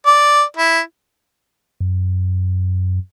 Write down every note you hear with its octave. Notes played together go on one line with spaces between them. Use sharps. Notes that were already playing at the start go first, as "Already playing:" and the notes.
D5
E4
F#2